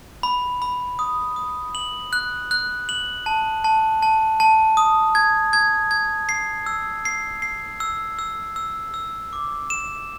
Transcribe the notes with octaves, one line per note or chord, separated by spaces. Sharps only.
B5
B5
D#6
D#6
F#7
F#6
F#6
F#7
A5
A5
A5
A5
D#6
G#6
G#6
G#6
C7
E6
C7
C7
E6
E6
E6
E6
D6
E7